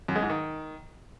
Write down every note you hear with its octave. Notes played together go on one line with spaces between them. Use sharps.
F#2
G#3
G#2
D#3